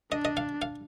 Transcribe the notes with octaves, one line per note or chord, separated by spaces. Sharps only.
D4 D#5
D#5
F5
F5